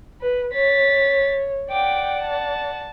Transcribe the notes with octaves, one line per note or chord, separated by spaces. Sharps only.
B4
C#5 A6 B6
D5 F#5 G5 D6
A5